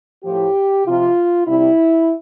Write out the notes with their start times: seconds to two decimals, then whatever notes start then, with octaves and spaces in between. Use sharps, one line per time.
0.25 A2 F3 G4
0.86 C3 F3 F4
1.47 C3 G3 E4